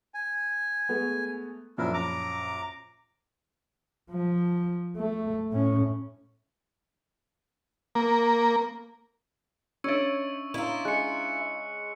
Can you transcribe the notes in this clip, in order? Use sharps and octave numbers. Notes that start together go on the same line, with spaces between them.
G#5
G#3 A3 B3
A#1 F#2 F3 D4 E4 A#4
A#5 D6
F3
A3
A2 C#4
A#3
C#4 D4 C#5 D#5 E5 C#6 E6
E4 F4 D#5 A#5 D6
G#3 F#6 C#7